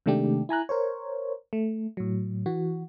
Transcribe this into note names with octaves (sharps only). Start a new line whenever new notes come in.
C3 D#3 G#3 A3 D4 G4
E4 G#5 A#5 F#6
A#4 C5 C#5
A3
A2 F#3
E3 F#4